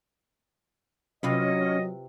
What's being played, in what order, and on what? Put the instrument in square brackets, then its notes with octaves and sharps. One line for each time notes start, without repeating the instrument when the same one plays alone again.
[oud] C3 F4 B4 [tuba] F#3 [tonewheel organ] C#4 [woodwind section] D#5